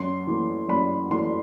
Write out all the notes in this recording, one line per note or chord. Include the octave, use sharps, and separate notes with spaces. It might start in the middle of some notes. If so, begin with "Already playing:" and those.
Already playing: F#2 C6
E3 A3
F#2 B5
E3 A3 C6